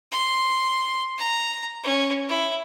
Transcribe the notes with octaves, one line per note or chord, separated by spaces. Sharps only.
C6
A#5
C#4
E4